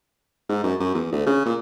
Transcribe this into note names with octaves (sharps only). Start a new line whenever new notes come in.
G#2
F#2
F#2
E2
D2
C#3
A#2